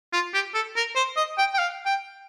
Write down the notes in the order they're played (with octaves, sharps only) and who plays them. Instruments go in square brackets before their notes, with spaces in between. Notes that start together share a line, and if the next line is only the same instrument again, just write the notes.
[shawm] F4
G4
A4
A#4
C5
D#5
G5
G5
F5
G5